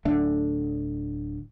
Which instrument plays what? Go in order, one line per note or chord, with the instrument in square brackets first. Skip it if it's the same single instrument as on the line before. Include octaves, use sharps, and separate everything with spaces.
[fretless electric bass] D1 D3 A3